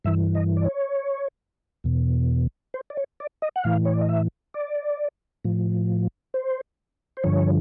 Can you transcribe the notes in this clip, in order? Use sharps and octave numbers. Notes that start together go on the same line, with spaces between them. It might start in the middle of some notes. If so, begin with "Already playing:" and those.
G2 E3 E5
D#5
D5
C#5
E2 B2
C5
D5
C#5
D5
D#5
F#5
A2 E3 F5
C#5
D5
D#5
E5
D5
A2 F3
C5
C5
G2 D3 F3 C#5